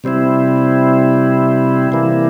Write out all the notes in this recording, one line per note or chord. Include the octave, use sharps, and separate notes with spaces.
C3 G3 C4 E4
C3 E3 G3 A#3 E4